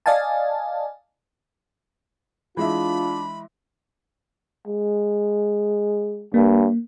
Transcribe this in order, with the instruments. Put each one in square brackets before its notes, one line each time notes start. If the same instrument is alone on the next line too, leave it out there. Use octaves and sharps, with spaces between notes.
[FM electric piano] D5 D#5 F5 G#5 A5
[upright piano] E3 G#3 E5 [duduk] D4 [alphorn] F4 [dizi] B5
[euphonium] G#3
[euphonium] G2 [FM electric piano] A#3